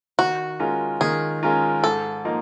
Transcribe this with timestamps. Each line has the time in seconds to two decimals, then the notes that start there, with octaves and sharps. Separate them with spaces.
0.19 D#3 F#4
0.59 G#3 C#4 F4 A#4
1.01 D#3 G#4
1.43 G#3 C#4 F4 A#4
1.84 G#2 A4
2.25 F3 A#3 D#4